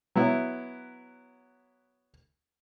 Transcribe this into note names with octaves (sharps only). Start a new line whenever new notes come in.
F#3 B3 E4